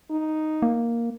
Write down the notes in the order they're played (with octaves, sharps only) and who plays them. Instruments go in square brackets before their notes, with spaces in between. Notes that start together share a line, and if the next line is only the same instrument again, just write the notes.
[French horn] D#4
[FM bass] A#3